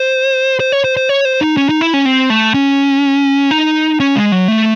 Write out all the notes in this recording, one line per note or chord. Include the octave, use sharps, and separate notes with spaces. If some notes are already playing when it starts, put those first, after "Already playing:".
Already playing: C5
C5
C#5
C5
C5
C#5
C5
D#4
C#4
D#4
E4
C#4
C4
A3
C#4
D#4
C#4
G#3
F#3
A3